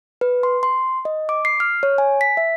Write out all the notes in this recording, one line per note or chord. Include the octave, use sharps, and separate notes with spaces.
B4
C6
C6
D#5
D6
C7
F6
C#5
G#5
B6
E5